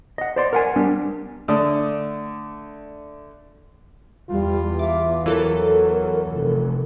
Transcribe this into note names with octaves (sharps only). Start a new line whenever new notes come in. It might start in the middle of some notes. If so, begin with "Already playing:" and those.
D#5 F#5
C5 D5 C6
A#4 F#5 G#5
G3 B3 D4 G4
D3 A3 D5 D#6
E2 G3 F4
E5 D6
E3 F#3 A4 A#4
F1